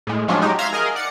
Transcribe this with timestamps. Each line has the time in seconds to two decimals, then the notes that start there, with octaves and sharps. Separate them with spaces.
0.07 A2 G#3
0.28 F3 F#3 G#3 C#4 D4 F4
0.41 F#3 G#3 D#4 G4
0.59 E5 F5 A#5 C6 G#6 A#6
0.73 G#4 A#4 D#5 F5 G#5
0.95 D5 F#5 C#7